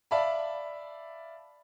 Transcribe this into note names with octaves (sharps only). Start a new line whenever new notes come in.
D5 E5 F5 A5 B5